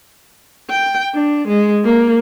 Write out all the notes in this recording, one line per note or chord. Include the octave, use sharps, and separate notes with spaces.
G5
D4
G#3
A#3